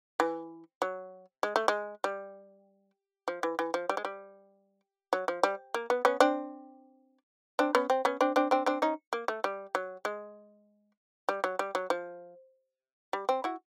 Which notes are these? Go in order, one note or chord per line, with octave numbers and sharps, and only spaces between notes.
E3
F#3
G#3
A3
G#3
G3
F3
E3
E3
F3
G3
G#3
G3
F#3
F3
G3
A#3
B3
B3 C#4
C4 D4
C4 D4
B3 C#4
C4
B3 C#4
C4 D4
C4 D4
C4 D4
C4 D4
C#4 D#4
A#3
A3
G3
F#3
G#3
G3
F#3
G3
F#3
F3
G3
C4
E4 F#4